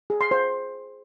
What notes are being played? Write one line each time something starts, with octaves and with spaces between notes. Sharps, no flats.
G#4
C6
C5